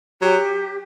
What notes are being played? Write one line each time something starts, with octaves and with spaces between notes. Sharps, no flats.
F#3 G4